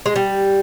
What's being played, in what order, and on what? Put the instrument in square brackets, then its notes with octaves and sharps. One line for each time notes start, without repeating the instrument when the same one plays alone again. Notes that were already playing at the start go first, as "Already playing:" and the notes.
[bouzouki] G#3
G3